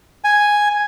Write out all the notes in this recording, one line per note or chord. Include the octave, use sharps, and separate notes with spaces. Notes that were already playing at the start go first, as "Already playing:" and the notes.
G#5